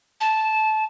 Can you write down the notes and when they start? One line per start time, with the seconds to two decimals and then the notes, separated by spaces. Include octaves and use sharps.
0.21 A5